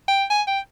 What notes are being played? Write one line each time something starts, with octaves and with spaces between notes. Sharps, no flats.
G5
G#5
G5